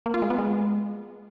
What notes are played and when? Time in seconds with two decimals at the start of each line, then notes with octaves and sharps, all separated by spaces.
0.06 A#3
0.14 F4
0.22 G#3
0.30 B3
0.38 G#3